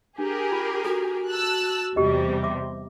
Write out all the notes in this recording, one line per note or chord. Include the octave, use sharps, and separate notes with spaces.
D4 G4 G#4 A#4
F4
F#4 A4
A5 E6 F#6
E2 C3 G3 G4 D#5
E5 C6 D6